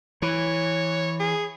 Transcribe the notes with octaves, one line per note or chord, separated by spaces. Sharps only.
E3 C#5
G#4